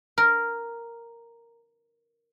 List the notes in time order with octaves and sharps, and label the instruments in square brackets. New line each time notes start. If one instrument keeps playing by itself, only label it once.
[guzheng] A#4